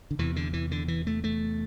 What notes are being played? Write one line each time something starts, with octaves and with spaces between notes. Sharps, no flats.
D3
E2 C3 E3
D3
E3
D3
E3
A3
A3